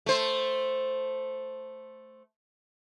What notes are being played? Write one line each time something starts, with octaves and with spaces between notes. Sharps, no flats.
A3 C5